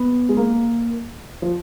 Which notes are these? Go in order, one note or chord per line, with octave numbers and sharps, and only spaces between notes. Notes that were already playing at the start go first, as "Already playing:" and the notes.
Already playing: B3
G#3
A#3
F3